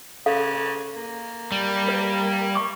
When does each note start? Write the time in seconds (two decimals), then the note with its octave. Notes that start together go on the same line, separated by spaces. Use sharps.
0.26 C#3 A4 F5
0.96 A#3
1.52 G3
1.88 B4
2.55 C#6 D6